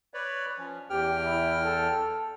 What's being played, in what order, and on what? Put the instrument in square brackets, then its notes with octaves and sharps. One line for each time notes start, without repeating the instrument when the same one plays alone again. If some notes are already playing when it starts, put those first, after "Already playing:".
[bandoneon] B4 C#5 D5
F3 C#4
[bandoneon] E2 G5 F6 [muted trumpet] G4
[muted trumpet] E4
A4